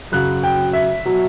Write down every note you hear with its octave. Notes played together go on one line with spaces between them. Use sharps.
F#2 C#3 F#3 F#6
G5
E5
B2 F#3